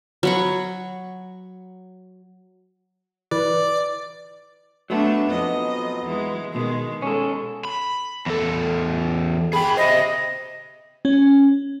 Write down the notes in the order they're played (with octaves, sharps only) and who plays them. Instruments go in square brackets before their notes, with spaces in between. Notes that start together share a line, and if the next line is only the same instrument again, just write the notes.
[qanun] F#3 B5 C#6
[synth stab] G#1 E3 B4 [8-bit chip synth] D5
[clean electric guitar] F#3 B3 [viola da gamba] A3 D4
[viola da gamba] F2 D#5
E3 G#3
B2 D#3 G#3
[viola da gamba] G#3 [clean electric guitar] C#4 A4
[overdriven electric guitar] B5
E2 A4
[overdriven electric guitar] G#4 G5 [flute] B5
[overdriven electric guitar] C5 E5 [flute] D#5
[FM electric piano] C#4